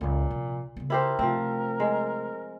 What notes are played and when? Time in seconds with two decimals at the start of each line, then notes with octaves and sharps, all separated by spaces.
0.01 C#2 F#2 A#2
0.31 C3 F3
0.77 C#3 B3
0.90 E4 G4 A#4 C5
1.19 C3 F3 A3 C4
1.80 G#3